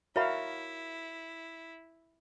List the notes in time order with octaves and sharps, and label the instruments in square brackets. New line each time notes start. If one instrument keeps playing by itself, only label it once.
[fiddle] E4 [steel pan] F#4 A#4 F5 [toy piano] C#5 E5 B5